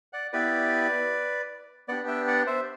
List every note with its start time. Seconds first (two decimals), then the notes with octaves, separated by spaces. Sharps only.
0.13 D5 F#5
0.33 B3 E4 G4 B4 D5
1.88 B3 D4 G4 D5 F#5
2.08 E5 G5
2.28 D5 F#5
2.47 C5 E5